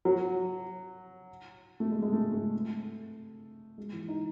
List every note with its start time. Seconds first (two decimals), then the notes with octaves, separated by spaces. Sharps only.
0.05 F#3
1.80 A3
1.91 G#3
2.02 G#3
2.13 A3
2.32 A3
3.78 G#3
3.93 E3
4.08 D#4